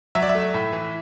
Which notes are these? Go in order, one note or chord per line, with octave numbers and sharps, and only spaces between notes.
F#3 E5
D5
E5
A3
A2
E3